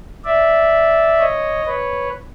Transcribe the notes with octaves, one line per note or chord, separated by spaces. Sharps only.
D5 E5
C#5 D#5
B4 C#5